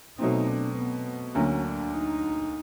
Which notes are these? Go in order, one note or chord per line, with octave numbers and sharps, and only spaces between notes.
B2 F#3 A3 C4 D#4
D4
B3
D2 D3 F#3 A#3 C#4
D4
D#4